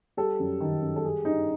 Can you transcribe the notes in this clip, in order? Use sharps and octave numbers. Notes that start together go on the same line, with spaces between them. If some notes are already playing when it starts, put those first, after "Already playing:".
G3 A4
F#2
D#3
F#2
A4
G3 G#4
G2 D#4